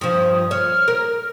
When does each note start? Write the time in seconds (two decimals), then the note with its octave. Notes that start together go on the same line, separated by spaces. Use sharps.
0.01 G2 F3 D#6
0.29 D#6
0.51 C#5 F6
0.88 A#4